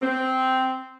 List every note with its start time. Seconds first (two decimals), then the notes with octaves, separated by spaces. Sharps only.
0.02 C4